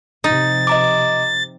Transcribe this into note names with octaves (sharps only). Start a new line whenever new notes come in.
C3 F3 D#4 A6
D#5 A#5 D6